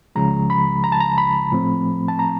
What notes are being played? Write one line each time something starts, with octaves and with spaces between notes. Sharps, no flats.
C#2 C#3 F3 G#3 A#5
B5
A#5
A5
A#5
B5
A2 F3 A3 C4
A5
A#5